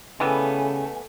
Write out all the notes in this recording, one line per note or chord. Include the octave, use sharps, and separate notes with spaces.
C#3 E3 G3 A3 B3 G#5